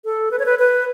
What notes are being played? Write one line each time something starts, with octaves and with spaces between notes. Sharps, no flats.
A4
B4
C#5
B4
B4